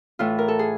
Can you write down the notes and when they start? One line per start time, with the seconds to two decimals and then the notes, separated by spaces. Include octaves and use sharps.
0.19 A2 E3 F4
0.39 A#4
0.48 A4
0.59 G#4